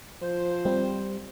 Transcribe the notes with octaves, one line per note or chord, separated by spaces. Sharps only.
F3 C5
G3 C4